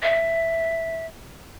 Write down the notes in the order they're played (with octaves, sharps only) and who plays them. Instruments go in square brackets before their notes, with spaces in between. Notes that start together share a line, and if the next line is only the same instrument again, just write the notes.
[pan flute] E5